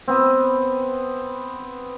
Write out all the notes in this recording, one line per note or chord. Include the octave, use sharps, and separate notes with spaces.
B3 C4